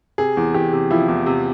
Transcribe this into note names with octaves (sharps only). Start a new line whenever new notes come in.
C3 G#4
E2
E2 G4
C3
F3 E4
E2
C3